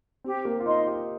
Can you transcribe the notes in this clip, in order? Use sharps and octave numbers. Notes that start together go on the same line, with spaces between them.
C4 G4
A#3
F4
D#4 D#5 C6
G4